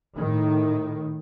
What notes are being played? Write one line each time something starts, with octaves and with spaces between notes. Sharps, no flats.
A2 D#3